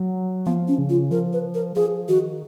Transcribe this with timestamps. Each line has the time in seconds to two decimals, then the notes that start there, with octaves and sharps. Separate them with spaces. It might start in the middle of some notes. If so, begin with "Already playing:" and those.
Already playing: F#3
0.46 F3 B3
0.68 C#4
0.78 C#3
0.89 F4
1.11 F3 A#4
1.33 B4
1.54 A#4
1.76 F3 G#4
2.08 D#3 F#4